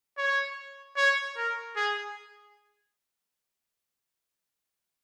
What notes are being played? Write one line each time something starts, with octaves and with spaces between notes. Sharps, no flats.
C#5
C#5
A#4
G#4